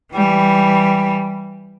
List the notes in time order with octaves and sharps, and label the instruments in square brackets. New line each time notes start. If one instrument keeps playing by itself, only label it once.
[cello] E3 G3